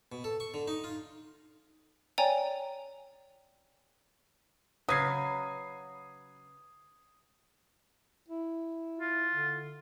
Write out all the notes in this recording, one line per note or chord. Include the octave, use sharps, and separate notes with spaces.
B2
A4
C#6
D3
D#4
F4
C#5 D5 G5 G#5 A#5
C#3 F#3 B4 D#6 G#6 C7
E4
F4
D3